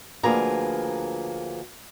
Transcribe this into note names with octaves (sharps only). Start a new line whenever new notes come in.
D2 F3 A#3 G#4 B4 A#5